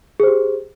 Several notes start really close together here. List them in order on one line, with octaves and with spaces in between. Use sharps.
G#4 C5 G4